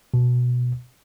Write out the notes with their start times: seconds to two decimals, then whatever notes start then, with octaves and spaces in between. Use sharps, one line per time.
0.14 B2